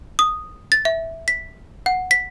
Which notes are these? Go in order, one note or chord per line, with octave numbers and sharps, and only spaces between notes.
D#6
A6
E5
B6
F#5
B6